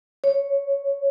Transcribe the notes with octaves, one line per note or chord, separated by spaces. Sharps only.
C#5